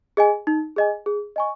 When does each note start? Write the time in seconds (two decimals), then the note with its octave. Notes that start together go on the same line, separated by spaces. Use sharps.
0.17 G#4 D#5 G#5
0.47 D#4
0.76 G#4 D#5 G#5
1.06 G#4
1.36 D#5 G#5 C#6